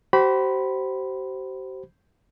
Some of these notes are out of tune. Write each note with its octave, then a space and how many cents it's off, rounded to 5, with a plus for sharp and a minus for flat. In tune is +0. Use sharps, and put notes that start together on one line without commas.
G4 -45 C5 +0 B5 +0